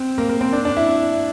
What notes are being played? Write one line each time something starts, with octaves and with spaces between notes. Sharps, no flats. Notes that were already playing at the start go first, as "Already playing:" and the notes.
Already playing: C4
A#3
A#3
C4
D4
D4
E4